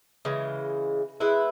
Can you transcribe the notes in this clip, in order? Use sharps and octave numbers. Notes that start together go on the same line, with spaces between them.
C#3 E3 G#3
G#3 B3 E4 B4